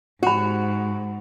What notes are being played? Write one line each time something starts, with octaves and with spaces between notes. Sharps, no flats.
G#2 F#4 G4 B5